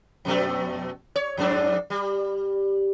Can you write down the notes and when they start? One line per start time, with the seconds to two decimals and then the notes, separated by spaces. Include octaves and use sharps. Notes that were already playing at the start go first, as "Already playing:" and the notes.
0.25 F2 B2 A3
1.16 C#5
1.37 F2 G#2 D4
1.90 G3